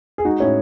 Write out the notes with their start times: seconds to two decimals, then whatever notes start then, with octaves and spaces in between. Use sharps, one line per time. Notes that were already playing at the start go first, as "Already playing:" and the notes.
0.18 G#4
0.25 G#3 D#4 F#4
0.40 A2 C#4 E4